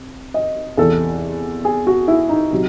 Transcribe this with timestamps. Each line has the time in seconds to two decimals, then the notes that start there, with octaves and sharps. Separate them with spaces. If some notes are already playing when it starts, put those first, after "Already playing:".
Already playing: C3
0.34 D#5
0.77 E2 C3 E3 A4
1.65 G#4
1.87 F#4
2.08 E4
2.29 D#4
2.52 C3 F#3